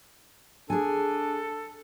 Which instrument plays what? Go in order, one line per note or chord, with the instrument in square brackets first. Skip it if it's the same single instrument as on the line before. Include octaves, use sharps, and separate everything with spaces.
[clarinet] D4 [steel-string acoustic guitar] G#4 G#5 [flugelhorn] A4